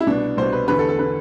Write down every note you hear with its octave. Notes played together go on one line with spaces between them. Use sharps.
E4
C2 B2 D4
C2 B2 C5
B4
E2 D3 B4
A4
A4
D3 B4